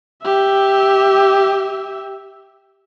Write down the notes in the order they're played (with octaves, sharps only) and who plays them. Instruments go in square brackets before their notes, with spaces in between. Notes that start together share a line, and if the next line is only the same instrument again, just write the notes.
[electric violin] G4 E5